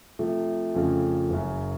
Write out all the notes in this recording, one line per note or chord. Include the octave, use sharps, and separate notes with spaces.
C3 F3 A3
F2 C#3 F3 A3
F#1 F#2 C#3